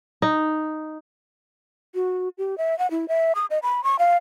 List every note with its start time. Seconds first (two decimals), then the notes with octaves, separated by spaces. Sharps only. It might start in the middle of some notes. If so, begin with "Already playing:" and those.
0.22 D#4
1.95 F#4
2.38 G4
2.58 E5
2.79 F#5
2.91 E4
3.08 E5
3.35 D#6
3.50 D#5
3.63 B5
3.84 C#6
3.99 F5